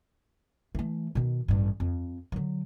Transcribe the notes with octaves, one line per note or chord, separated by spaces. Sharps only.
E3 A3
B2 D#3
A1 G2
F2
D3 F#3